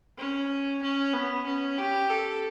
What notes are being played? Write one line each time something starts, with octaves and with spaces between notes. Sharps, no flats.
C#4
C#4
B3
C#4
G4
A4